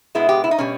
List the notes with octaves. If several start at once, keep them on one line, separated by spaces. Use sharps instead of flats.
B2 G#3 B3 E4
G4
E4
D#4
B2 G3 C#4